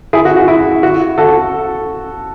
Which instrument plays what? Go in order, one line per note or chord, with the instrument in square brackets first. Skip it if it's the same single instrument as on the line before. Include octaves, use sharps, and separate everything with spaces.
[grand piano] E4 G#4
F#4
F#4
E4
F#4
F#4 A4